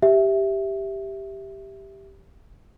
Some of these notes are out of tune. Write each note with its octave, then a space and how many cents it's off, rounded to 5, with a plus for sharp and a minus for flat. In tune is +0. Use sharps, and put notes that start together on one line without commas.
G4 +0 E5 +0